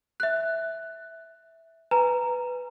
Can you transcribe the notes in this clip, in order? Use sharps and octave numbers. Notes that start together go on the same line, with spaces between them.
E5 F#6
B4 G#5 A#5